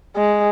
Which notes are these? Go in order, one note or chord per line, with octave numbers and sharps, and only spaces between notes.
G#3